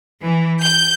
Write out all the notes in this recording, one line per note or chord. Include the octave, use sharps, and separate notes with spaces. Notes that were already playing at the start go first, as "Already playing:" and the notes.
E3
G6